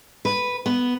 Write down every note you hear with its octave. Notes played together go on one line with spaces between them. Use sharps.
B4
B3